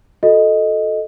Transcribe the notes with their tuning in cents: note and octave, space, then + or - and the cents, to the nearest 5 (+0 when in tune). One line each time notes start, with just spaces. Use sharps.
F#4 -30 A4 +0 D#5 +0